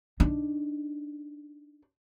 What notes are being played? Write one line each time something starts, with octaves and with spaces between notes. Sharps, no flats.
D4 D#4